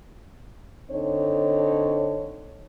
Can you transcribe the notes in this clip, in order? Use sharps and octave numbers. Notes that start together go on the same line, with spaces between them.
D3 C4 D#4 C#5